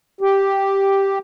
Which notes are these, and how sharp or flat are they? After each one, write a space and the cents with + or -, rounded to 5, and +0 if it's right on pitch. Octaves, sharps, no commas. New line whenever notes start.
G4 +0